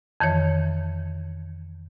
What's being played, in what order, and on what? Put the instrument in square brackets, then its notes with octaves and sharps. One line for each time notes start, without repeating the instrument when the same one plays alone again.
[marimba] F2 D#3 E3 C#5